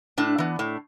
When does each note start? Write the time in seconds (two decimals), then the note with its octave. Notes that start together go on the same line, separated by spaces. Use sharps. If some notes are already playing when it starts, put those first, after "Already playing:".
0.18 A2 D4
0.38 E3 B3
0.59 A2